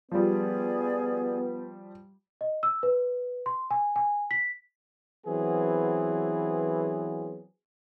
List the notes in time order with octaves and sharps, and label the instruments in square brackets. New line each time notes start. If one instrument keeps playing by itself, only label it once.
[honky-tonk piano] F3 G3 [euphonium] B3 [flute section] G#4 D5
[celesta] D#5
E6
B4
C6
G#5
G#5
B6
[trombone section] E3 F#3 B3 C4 G#4